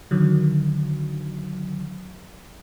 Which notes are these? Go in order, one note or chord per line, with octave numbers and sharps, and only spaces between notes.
D3 D#3 F#3